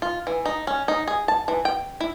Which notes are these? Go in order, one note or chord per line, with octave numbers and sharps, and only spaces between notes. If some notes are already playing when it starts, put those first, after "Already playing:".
F4
E3
D#4
C#4
D#4
G#4
A5
E3
G5
E4